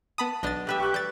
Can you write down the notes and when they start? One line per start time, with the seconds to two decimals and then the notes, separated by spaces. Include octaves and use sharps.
0.18 B3 A5 B5 D#6
0.43 B1 B2 D4 D#5 A6
0.67 A3 G4 B4 E5
0.80 C#6 F#6
0.94 G3 G6 A6